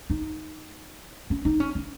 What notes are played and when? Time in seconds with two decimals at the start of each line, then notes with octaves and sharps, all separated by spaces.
0.10 D#4
1.30 C#4
1.45 D#4
1.60 C#4
1.75 C#4